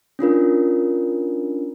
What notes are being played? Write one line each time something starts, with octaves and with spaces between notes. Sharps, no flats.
C#4 D4 F4 A#4